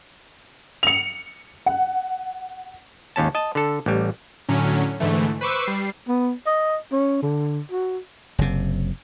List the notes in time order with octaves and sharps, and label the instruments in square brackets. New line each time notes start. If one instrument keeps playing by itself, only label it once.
[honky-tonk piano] C#7 F7
F#5
[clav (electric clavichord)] G#1 D#2 C#4 A5
D#5 A5
D3 A4
A1 G3
[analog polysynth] A2 D3 F#3 C#4
G#2 D3 E3 A3
B4 C5 C#6 D6 E6
G3 C7
[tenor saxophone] B3
D#5
C#4
D3
F#4
[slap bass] F#1 C3